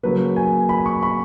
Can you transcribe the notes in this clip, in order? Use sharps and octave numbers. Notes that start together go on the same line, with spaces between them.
C#3 F#3 A#3 B4
G#5
B5
C#6
B5